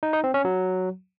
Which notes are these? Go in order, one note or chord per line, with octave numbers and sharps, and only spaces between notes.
D#4
D#4
C4
C#4
F#3